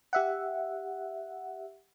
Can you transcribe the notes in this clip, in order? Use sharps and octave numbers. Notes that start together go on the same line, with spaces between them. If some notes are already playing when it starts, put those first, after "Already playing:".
G4 E5 F#5